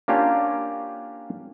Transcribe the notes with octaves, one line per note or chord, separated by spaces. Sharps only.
A#3 C#4 D4 F4 G4 F5